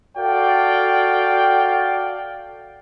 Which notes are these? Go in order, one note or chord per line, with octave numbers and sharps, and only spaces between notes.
F#4 A4 D5 F5 G5